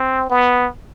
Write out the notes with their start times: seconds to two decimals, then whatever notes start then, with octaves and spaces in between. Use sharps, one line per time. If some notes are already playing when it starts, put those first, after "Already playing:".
Already playing: C4
0.30 B3